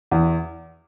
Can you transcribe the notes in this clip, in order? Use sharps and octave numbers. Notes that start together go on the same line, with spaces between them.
E2